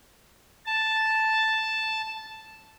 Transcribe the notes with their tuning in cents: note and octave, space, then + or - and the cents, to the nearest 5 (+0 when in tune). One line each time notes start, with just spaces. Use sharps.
A5 +0